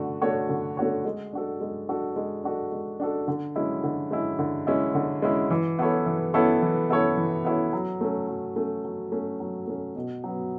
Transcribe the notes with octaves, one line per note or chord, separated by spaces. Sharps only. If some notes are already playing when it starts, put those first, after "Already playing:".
Already playing: D3 A3 D4 F#4
A3 D4 F#4 C#5
D3
A3 D4 F#4 C#5
G#3
D4 F#4 A4
G#3
D4 F#4 A4
G#3
D4 F#4 A4
G#3
D4 F#4 A4
D3
G#3 C#4 E4
D3
G#3 C#4 E4
D3
G#3 C#4 E4
D3
G#3 C#4 E4
E3
B3 E4 A4 C#5
E3
B3 E4 A4 C#5
E3
B3 E4 A4 C#5
E3
B3 E4 A4 C#5
F#3
A3 C#4
F#3
A3 C#4
F#3
A3 C#4
F#3
A3 C#4
B2
F#3 B3